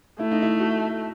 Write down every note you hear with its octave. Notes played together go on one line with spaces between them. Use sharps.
A3 E4
D#4
E4
F#4